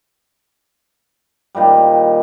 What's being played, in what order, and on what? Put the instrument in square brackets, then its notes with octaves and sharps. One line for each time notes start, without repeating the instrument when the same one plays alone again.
[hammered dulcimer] A#2 D#3 F3 G3